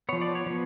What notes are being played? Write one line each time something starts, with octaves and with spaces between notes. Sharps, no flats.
F3 B3 C#5
D5
C#5
F3 B3